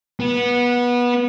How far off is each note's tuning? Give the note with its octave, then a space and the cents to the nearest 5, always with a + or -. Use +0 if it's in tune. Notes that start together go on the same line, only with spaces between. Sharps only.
B3 -20